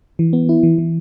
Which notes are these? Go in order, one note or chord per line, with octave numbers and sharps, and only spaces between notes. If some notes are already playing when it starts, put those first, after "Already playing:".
E3
B3
E4
E3
E3